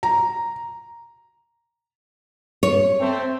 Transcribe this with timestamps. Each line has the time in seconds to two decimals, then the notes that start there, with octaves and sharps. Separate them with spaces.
0.03 A#5
2.63 C#5
3.00 A3 C4